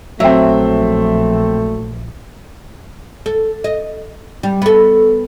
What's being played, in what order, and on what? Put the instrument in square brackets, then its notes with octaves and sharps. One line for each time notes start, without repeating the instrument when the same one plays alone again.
[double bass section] A#1 [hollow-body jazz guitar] F#3 [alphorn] A3 [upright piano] C4 E5
[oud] A4
D#5
G3
B3 A4